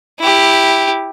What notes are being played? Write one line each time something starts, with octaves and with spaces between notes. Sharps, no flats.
E4 G4